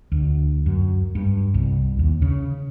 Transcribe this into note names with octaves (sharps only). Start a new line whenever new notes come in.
D2
F#2
G2
C2
D#2
C#3